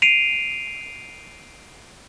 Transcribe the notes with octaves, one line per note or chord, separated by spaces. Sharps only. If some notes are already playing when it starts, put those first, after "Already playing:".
C7 D7 D#7 F7